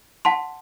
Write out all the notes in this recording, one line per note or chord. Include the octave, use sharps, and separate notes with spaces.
F#5 A5 C6